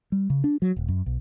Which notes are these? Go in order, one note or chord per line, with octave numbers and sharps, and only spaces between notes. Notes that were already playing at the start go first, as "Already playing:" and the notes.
G3
C#3
D4
F#3
D#1
F#2
B1